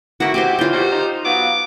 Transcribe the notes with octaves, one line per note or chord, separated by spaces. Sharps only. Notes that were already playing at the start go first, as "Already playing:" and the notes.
A#3 C#4 E4 F#4 E5 F#5
C4 F#4 G4 C5 G#5 D6
E3 F4 C#5 G5
A#2 D#3 F#4 G4 C5
D#4
F#3 B3 F5 D6